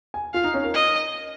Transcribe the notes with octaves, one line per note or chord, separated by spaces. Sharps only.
G#5
F4 F5
D#4
C#4
A#4
D#5